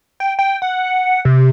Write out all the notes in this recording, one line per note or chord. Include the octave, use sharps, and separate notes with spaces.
G5
G5
F#5
C3